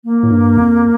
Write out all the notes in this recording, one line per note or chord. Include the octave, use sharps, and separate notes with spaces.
A#3
A2
G2
F2